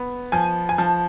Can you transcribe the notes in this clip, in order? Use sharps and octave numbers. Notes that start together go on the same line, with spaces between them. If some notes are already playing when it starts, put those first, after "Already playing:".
Already playing: B3
F3 G#5
G#5
F3 A5